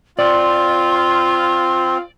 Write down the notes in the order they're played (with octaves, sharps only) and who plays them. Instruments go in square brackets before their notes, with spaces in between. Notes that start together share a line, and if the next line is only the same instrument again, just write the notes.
[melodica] C4 [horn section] F4 [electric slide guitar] D5 [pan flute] C6